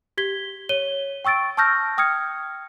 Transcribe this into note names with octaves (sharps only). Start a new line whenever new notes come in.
G4 G#6 B6 G7
C#5 D#7 G7
G5 C#6 E6 A6 D7
A5 C#6 E6 F6 G6 A#6
G5 D#6 F6 G#6 C#7